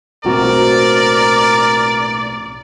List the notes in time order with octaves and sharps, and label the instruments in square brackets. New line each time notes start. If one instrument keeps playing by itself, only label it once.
[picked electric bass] B1 A2 [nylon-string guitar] C4 F#4 [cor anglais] A#4 [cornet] D5